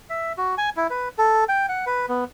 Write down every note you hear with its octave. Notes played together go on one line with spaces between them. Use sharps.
E5
F#4
G#5
E4
B4
A4
G5
F#5
B4
B3